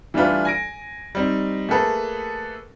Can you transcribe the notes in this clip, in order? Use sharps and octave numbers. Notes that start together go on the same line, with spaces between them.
E3 G3 A3 D4 F4 B4
G#5 A#6 D7
G3 C4 D#4
A3 A#3 G#4 A4 B4